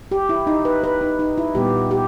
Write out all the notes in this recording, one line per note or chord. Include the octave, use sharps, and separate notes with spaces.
G4
E4
D#4
B4
B4
D#4
D#4
E4
A#2 G3 B3 G4
G4